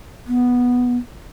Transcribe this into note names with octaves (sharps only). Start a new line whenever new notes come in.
B3